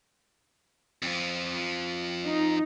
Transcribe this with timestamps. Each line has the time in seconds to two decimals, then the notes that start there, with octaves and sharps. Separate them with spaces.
1.02 F2 F3
2.25 D#4